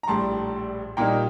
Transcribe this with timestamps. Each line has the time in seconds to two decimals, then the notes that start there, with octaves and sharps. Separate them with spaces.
0.03 A#5
0.08 A#1 A2 G3 A5 C6
0.97 A#2 G3 A#3 D#4 G5 A#5